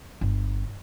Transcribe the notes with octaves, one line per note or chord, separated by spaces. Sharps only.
G1